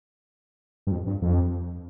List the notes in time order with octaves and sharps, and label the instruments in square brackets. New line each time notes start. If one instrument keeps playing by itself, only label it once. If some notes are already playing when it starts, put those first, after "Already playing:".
[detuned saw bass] G2
F2
G2
F2